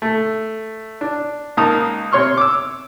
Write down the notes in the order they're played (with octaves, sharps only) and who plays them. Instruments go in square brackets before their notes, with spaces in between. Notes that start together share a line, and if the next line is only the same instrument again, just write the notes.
[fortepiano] A3
D4
C#2 A#3 D#4 A5 A#5 D#6
C3 C#5 C6 C#6 F6
D6 E6